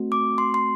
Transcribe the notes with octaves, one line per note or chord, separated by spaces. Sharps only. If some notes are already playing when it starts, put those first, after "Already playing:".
Already playing: A3 C4 F#4
D6
C6
C6